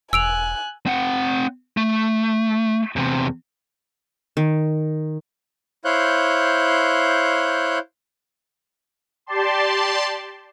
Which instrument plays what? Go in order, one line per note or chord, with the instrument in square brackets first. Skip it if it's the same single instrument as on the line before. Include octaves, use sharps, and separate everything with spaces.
[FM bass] E1 [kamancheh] G#5 F#6 [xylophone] E6 D7 F7
[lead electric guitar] C4 F#5
A3
E2 C3
[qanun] D#3
[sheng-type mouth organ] E4 C5 C#5 F5 F#6 G6
[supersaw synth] G4 D5 A5 C6